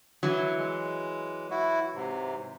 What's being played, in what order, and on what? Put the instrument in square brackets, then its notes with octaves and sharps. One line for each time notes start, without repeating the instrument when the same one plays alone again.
[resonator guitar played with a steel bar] E3 F#3
[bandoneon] G#3
E4 F#4
G#2 C3